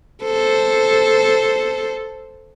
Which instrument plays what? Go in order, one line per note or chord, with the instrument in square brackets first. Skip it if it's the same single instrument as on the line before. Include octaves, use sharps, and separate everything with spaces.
[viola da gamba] A4 C5